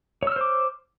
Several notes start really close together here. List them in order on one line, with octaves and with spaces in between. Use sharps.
C#5 E6 F6 C5 D6